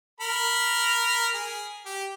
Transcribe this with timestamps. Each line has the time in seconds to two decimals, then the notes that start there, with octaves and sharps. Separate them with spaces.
0.20 A#4 B5
1.33 G#4
1.85 G4